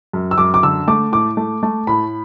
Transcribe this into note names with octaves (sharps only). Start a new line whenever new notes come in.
F#2
E6
F#2 D6
D6
D3 E6
A3 D6
A2 D6
A3
A3
A2 B5